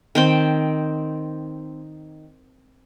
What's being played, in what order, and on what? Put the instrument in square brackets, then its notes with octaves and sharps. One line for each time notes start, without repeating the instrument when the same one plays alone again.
[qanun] D#3 C4 G5